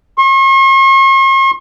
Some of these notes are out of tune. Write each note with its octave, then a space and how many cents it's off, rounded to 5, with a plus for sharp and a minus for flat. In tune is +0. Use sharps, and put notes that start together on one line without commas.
C#6 -45